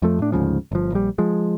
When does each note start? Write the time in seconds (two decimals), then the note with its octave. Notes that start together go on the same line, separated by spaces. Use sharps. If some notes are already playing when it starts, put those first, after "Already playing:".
0.02 F2 F3 A3
0.19 A2 D4
0.32 D2 G#2 C#3 F3
0.71 G1 F3
0.92 A#1 G3
1.18 F3 G#3